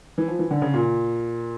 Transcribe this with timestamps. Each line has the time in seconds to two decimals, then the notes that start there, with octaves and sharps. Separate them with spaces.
0.18 E3
0.28 F3
0.39 E3
0.51 D3
0.62 C#3
0.74 A#2